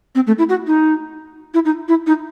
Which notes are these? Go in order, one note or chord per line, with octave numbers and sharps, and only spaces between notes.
C4
A3
E4
F#4
D#4
E4
D#4
E4
D#4